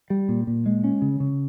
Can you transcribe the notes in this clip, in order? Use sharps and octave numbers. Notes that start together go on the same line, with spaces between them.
G3
A#2
A#2
G#3
C#4
C#3
C#3